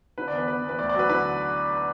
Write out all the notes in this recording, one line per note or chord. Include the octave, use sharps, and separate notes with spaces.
D3 B4
E2 D5
B4
E2 B4
E2
B4
D2 D5
D5
F#3 B4
D3 B4